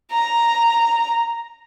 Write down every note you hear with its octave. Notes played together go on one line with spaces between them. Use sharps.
A#5